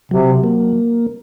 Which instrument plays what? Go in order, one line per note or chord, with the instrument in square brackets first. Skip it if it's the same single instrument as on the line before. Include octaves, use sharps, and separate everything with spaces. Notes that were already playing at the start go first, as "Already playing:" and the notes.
[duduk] C3 [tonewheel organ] F#3
[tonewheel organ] A#3